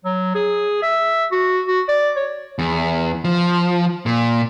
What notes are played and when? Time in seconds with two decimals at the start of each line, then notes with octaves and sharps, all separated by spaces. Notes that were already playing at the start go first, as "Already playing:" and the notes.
0.05 F#3
0.35 G#4
0.82 E5
1.32 F#4
1.67 F#4
1.88 D5
2.16 C#5
2.59 E2
3.24 F3
4.06 A#2